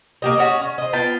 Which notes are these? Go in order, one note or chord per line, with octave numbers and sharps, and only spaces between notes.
A#3 G4 D#5
C#4 F#4 C#5 D#5
C#4
C5 D#5
B3 F4 G5 A5